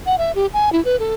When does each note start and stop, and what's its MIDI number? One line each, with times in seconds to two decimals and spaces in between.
0.06 0.16 78
0.18 0.32 76
0.35 0.46 67
0.53 0.70 80
0.73 0.83 64
0.85 0.99 71
0.99 1.15 69